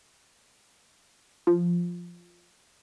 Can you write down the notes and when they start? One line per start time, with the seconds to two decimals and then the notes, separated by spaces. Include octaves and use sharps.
1.47 F3